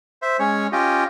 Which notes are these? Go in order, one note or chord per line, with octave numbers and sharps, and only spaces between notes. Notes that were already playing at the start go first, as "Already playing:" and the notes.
C5 E5
G#3 C#4 C#5
C#4 F4 G4 D#5